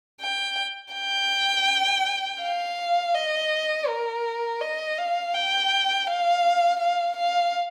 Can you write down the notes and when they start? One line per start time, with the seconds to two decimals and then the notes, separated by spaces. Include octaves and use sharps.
0.21 G5
0.94 G5
2.41 F5
3.14 D#5
3.88 A#4
4.61 D#5
4.98 F5
5.34 G5
6.07 F5
6.80 F5
7.17 F5